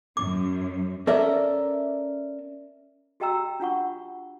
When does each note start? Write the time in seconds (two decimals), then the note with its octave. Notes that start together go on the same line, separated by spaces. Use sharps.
0.17 F#2 D6
1.07 C#4 A4 A#4 D5 E5
3.20 F#4 G4 D#5 G5 A#5 E6
3.60 D4 F4 F#5 C#6